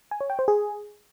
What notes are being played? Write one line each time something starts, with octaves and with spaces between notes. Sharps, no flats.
G#5
C#5
G5
C5
G#4